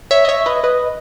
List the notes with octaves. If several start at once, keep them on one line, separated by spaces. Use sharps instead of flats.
C#5 E5
D#5
C#5 E5
B4 D#5
B4 D#5